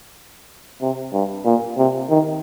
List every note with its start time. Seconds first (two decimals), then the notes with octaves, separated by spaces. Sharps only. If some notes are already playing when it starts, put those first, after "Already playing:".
0.81 C3
1.13 G2
1.45 A#2
1.77 C3
2.09 D#3